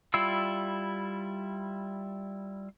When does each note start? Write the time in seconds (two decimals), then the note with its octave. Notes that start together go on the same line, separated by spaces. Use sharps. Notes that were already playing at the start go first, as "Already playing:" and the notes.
0.14 G3 E4 F4 E6